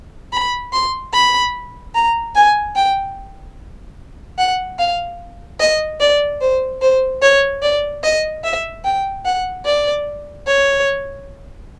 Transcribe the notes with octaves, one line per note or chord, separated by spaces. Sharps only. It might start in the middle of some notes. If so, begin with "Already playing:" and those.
B5
C6
B5
A#5
G#5
G5
F#5
F5
D#5
D5
C5
C5
C#5
D5
D#5
E5
G5
F#5
D5
C#5